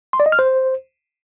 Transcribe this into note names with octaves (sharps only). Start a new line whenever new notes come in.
C6
D5
D#5
F6
C5